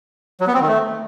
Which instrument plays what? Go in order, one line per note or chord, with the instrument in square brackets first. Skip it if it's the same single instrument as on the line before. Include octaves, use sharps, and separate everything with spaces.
[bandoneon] F#3
B3
C4
D#3
A3